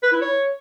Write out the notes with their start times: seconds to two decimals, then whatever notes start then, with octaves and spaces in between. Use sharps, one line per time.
0.03 B4
0.12 E4
0.21 C#5